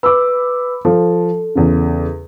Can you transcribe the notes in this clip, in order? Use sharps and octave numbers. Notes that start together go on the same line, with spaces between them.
B4 B5 D6 E6
F3 A4
E2 C#3